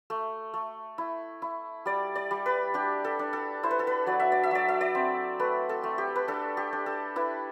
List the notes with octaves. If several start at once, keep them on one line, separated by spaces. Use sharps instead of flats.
A3
A3
E4
E4
G3 D5
D5
G3
B4
D4 G4
A4
D4
A4
E4 C5
B4
A4
B4
F#3 D5
E5
D5
E5
F#3 D5
E5
D5
C4
A3 B4
A4
A3
G4
B4
D4 A4
G4
D4
A4
E4 B4